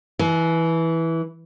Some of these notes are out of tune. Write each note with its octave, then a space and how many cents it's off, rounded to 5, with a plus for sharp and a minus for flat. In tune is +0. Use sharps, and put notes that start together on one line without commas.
E3 -10 G#5 +30